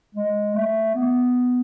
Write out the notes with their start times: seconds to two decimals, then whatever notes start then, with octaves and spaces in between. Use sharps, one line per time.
0.15 G#3
0.55 A3
0.95 B3